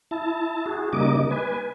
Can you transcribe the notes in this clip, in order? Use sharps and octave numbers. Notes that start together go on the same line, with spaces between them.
E4 A5
F#4 G#4
C#3 G3 A#3 D#4 D#5 D6
B4 G#5